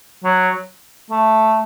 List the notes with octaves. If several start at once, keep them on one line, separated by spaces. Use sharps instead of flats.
F#3
A3